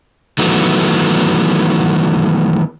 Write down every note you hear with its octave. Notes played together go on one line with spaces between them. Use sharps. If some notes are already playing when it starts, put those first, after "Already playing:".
D#3 E3 F#3 A3 B3